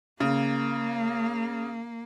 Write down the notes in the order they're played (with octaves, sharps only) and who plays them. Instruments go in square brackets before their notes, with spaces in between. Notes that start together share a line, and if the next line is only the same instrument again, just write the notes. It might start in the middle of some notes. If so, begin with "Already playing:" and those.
[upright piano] C#3 [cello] A#3